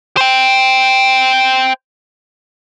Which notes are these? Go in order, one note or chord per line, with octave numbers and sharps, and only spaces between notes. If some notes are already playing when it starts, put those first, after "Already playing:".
C5 G5